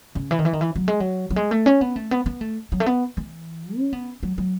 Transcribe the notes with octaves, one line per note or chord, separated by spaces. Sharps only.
C#3
E3
D#3
E3
D#3
E3
F#3
G#3
F#3
F#3
G#3
A3
C#4
B3
A3
B3
B3
A3
F#3
A3
B3
E3
C#4
B3
F#3
F#3